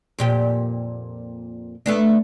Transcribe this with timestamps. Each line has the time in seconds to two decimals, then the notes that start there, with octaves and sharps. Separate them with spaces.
0.19 F2 A#2 G4
1.86 A3 B3 D4